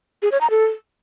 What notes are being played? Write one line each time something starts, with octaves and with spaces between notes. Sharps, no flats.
G#4
C#5
A#5
A4